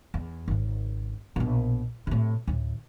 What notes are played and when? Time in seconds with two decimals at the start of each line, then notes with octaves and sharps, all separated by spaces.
0.14 E2
0.48 G#1 C#3
1.36 A#1 B2
2.07 A2 C3
2.47 D2 A2